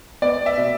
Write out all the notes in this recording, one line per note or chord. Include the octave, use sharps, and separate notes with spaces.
B3 D5
E5
B2